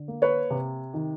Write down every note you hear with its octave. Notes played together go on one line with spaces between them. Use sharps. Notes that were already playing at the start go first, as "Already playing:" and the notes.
Already playing: D3
A#3
B4 C#5
C3
D#3